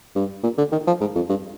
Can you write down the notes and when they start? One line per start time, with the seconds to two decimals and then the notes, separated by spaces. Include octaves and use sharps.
0.15 G2
0.43 A#2
0.58 D3
0.72 D#3
0.87 F3
1.00 G#2
1.15 F2
1.29 G2